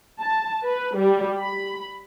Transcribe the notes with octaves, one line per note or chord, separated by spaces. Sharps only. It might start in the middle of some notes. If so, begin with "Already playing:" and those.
A5
B4
G3
B5